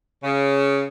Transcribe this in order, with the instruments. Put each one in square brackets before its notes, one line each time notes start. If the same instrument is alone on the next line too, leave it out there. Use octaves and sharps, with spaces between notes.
[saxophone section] C#3